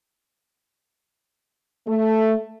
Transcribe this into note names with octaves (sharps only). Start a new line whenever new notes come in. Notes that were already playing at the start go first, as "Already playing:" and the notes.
A3